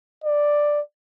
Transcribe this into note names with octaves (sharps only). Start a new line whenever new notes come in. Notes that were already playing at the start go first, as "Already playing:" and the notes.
D5